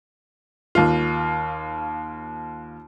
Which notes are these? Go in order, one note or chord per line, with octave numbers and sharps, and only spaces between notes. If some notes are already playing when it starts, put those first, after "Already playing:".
D#2 F4